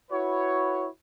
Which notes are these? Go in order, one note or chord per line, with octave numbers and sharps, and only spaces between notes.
E4 F#4 B4 C#5